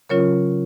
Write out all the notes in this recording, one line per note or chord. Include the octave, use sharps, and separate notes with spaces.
C#3 F#3 C#4 F4 A#4 C#5